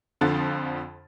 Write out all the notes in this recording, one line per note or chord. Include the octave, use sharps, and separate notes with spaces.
F2 D3 F3 A6